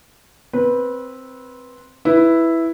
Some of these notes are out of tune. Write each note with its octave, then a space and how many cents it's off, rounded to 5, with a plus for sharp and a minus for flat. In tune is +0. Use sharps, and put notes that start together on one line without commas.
C4 +0 B4 -15
E4 +0 B4 +0